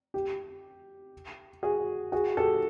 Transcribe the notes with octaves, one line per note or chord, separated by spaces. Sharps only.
G4
F#4 G#4
F#4 G#4
G4 A4